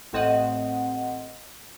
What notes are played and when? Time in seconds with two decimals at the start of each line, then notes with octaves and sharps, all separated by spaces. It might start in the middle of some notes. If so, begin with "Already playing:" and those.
0.13 A1 A2 C4 D#5 F#5